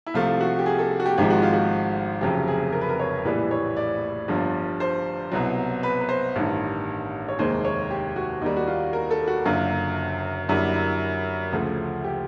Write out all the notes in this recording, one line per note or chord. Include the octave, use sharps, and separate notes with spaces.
E4
C2 C3 F3 A3 F4
F#4
G4
G#4
A4
F#4
G4
G#1 G#2 F3 G#3 G4
F#4
F4
F#4
F1 F2 C#3 F#3 G4
G#4
A#4
B4
A#4
C#5
A#1 A2 E3 G3 B4
C#5
D5
G1 G2 D3 F3
C5
C2 B2 F#3
B4
B4
C5
A1 G2 D#3
C#5
F1 D#2 D#3 G#3 C5
C#5
G4
F#4
D#2 D#3 G3 D#4
F#4
F4
A#4
A4
F#4
F#1 F#2 D3 F4
F#2 D3 G3 A#3 E4
E4
D2 C#3 F3 A3
G4